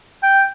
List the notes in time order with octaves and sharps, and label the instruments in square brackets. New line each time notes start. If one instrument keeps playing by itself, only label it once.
[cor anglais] G5